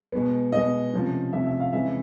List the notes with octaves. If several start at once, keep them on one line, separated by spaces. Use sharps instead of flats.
B2 G#3 B3
B2 G#3 B3 D#5
C3 F3 A3 C#4
C3 F3 A3 C#4 E5
E5
F5
C3 E3 G#3 C#4 E5